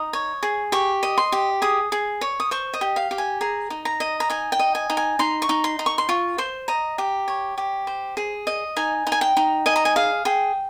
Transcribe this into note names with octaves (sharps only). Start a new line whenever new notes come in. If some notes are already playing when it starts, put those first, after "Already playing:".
Already playing: D#4 D#6
C#5
G#4
G4 C#6
D#5
C6
G4
G#4 D#6
G#4
C#5
D#6
C5 C#6
D#5
G4
F5
G4
G#5
G#4 A#5
D#4
A#5
D#5
A#5
D#4 G#5
G5
D#5
G#5
D#4
G#5
D#4 C6
C#6
D#4
C6
D#4
C#6
C6
F4 C#6
C5 C6
D#5 A#5
G4
C#5
G4
C5
G#4
D#5
D#4 G#5
D#4
G#5
G5
D#4
D#5 G#5
A#5
G#5
G#4 F5
G#4 G5